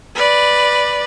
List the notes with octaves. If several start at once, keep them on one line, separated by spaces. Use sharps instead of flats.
B4 D5